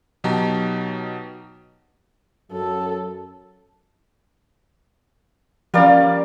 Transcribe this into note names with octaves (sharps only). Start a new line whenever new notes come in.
B2 F#3 D#4 G4 A5 A#5
F#2 F#3 A4
F3 G3 A#3 C#4 D5